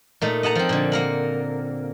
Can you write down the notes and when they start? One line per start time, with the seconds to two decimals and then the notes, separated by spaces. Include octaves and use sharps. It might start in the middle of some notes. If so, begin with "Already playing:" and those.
0.21 A#2 A3 D#4
0.43 D#5 F#5 A5 A#5
0.55 F3 C4
0.69 A#2 D3
0.92 A#3 A#4 F#5